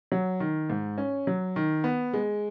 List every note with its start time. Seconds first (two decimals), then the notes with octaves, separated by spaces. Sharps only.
0.12 F#3
0.40 D#3
0.70 G#2
0.98 C#4
1.27 F#3
1.56 D#3
1.84 B3
2.13 G#3